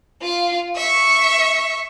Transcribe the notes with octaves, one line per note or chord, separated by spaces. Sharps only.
F4
E5 C#6